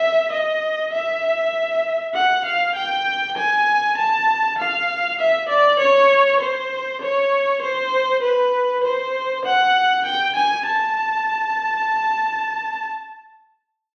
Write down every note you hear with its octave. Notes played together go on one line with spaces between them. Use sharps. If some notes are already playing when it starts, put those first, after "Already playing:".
Already playing: E5
D#5
E5
F#5
F5
G5
G#5
A5
F5
E5
D5
C#5
C5
C#5
C5
B4
C5
F#5
G5
G#5
A5